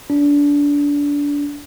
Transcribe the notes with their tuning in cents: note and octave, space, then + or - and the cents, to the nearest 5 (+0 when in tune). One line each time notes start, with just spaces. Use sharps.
D4 -25